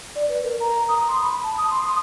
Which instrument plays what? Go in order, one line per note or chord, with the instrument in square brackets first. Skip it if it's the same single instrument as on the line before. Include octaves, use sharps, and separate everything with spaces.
[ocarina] D5
B4
A#4
A#5
D#6
C6
B5
A5
D#6
C6
D#6